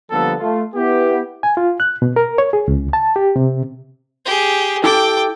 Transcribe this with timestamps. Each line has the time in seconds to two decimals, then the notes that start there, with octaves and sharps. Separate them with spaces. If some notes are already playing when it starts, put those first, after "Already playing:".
0.11 D3 F3 G3 A#3 B3 A4
0.40 A3 F4
0.75 B3 E4 G4
1.43 G#5
1.57 F4
1.80 F#6
2.02 B2
2.16 A#4
2.38 C#5
2.53 G#4
2.68 C#2
2.93 A5
3.16 G4
3.36 C3
4.26 G4 G#4
4.84 E4 G4 A4 G5 D6